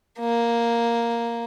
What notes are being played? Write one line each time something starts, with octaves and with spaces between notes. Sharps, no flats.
A#3